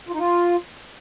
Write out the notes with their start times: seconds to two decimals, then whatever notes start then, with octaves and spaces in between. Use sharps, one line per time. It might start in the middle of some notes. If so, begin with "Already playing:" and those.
0.09 F4
0.14 D#4
0.19 F4